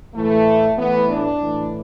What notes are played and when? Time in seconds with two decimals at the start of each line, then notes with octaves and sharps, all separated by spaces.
0.14 A2 E3 A3
0.77 A2 E3 B3
1.09 D4
1.41 A2 E3